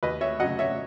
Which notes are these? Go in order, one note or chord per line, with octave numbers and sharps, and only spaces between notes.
D#2 B4 D#5
C#5 E5
C#3 F#3 D#5 F#5
C#5 E5